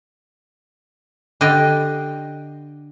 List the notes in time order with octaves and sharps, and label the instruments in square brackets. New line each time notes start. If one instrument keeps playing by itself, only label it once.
[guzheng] D3 G4 D#5 C6